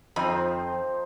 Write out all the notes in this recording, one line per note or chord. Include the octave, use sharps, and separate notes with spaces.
F2 F3 C4 D#4 C5